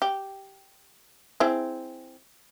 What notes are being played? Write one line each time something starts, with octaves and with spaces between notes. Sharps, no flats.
G4
C4 E4 G#4